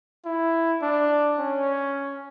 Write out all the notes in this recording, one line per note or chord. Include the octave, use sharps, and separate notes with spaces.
E4
D4
C#4